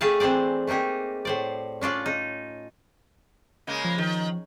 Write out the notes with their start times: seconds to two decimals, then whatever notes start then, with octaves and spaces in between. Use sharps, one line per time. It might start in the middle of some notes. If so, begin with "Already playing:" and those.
0.01 A3 G4 G#4 D5 F5 A5
0.20 E3 C4 D4 C5 D5
0.67 A3 A#3 D#4 G4 G#4
1.25 A2 C5 D5
1.81 C#4 D4 F4 D5
2.06 D#4
3.67 C#3 G#3 A#3
3.85 F3
3.98 D#3